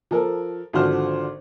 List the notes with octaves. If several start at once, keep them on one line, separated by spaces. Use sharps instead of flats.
F3 A4 A#4
G#1 D3 F3 F#4 C5 F6